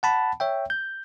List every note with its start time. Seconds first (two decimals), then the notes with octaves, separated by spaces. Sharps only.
0.03 F#5 A5 B5
0.40 C#5 E5 G5
0.70 G6